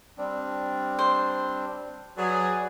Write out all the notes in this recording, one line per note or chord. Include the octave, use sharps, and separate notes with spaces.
G3 C4 D4
C5
F#3 F#4 G#4 B4 D5